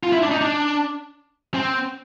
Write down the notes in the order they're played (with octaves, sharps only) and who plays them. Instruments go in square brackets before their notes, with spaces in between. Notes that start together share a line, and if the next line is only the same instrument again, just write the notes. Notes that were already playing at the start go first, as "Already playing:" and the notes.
[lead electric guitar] F4
E4
D4
D#4
D4
C4